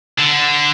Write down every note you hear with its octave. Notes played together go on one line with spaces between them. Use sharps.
D3